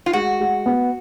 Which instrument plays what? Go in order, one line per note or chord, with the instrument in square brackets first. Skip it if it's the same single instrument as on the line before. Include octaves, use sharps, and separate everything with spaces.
[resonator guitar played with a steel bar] F4
[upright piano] G#3 [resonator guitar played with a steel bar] F#4
[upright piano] G#3
B3